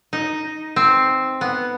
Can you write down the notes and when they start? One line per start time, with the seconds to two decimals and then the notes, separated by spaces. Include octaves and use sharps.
0.13 D#4
0.76 C4
1.41 B3